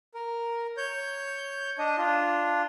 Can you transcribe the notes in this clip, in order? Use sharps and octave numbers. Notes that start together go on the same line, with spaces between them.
A#4
C#5 G6
D4 D#5
D4 F4